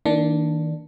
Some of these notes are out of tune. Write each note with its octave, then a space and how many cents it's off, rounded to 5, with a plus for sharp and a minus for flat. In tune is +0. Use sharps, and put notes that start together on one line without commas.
D#3 +35 A#3 -15 D4 +0